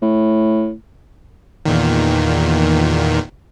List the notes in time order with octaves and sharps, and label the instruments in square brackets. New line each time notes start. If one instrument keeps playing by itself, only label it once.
[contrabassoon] A2
[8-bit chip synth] E2 A#2 D#3